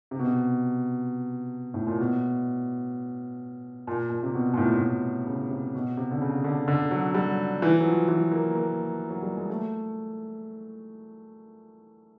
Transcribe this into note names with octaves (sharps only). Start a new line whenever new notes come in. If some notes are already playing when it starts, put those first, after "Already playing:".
C3
B2
C3
A2
A#2
B2
A#2
A#2
C3
B2
A#2
A2
A2
A#2
C#3
C3
B2
C3
D3
C#3
D3
D3
F#3
G3
E3
F#3
F3
E3
A#3
A#3
F#3
G3
G#3
A3